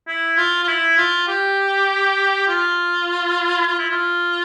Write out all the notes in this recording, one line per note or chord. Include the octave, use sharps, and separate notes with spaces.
E4
F4
F4
E4
F4
G4
F4
F4
E4
F4